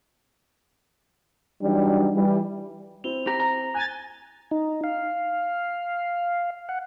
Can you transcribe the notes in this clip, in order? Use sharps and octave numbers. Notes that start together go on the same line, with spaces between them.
E3 F#3 G3 D4 D#4
E3 G3
C4 E4 F7 G7
G4 A#5 A#6
A#5
G#5 A#5 F#6 A6
D#4
F5
F#5